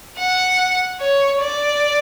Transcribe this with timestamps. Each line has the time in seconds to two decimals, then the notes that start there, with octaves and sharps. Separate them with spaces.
0.18 F#5
1.01 C#5
1.42 D5